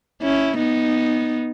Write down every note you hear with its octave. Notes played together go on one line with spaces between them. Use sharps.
C#4 E4
B3 D#4